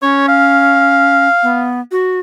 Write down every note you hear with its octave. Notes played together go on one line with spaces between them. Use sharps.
C#4 C#5
F5
B3
F#4